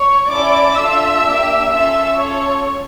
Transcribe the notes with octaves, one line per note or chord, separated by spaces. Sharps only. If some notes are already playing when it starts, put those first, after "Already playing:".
Already playing: C#5 C#6
C#4 E4 A4 D5 D6
D4 F4 A4 E5 E6
A#3 D4 G4
C#4 F4 A4 E5 E6
C#4 F4 A4 C#5 C#6